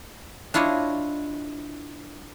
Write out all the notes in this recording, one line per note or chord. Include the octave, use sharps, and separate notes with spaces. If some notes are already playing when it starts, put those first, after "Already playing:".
D4 E4 F4 C#5 D#5